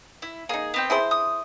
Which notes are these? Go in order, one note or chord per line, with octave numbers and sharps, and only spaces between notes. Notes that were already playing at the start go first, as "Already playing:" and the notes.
E4
A#3 D#4 G#4
B3 C4 G5
E4 G#4 C5
D#6